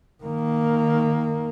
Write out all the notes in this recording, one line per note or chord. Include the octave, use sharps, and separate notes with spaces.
D#3 A#3